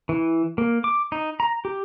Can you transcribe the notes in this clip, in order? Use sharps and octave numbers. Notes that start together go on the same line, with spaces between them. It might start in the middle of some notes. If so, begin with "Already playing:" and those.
E3
A#3
D6
D#4
A#5
G4